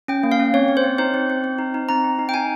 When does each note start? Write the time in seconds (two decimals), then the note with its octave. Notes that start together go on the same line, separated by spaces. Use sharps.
0.08 C#4 G5
0.23 A#3
0.32 F5
0.39 C#4
0.54 C4 C#5
0.68 C4
0.77 C5
0.84 C4
0.98 D#4 C5
1.14 C4
1.30 C4
1.44 C4
1.59 D#4
1.74 D#4
1.89 C4 A#5
2.04 C4
2.19 D#4
2.29 G5
2.34 D#4 G#5